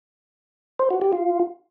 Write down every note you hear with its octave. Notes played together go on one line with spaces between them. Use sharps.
C5
F#4
G4
F4